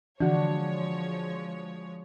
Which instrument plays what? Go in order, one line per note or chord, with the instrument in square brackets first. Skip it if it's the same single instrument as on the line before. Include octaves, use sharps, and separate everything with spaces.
[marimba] D3 E3 [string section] F3 G#3 C#5 [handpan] D4 F#4